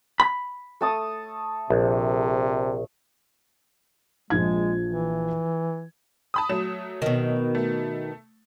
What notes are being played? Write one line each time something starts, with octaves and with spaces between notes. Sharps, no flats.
B5
A3 A5 D#6
A#1 C3
A#1 F3 G#3 G#6
E3
A5 B5 D#6
F#3 A3 E7
B2 D#3
A3